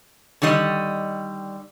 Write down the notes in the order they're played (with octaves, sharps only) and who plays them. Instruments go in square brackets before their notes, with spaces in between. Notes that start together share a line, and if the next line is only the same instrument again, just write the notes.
[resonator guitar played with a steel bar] D3 D#3 G3 D#5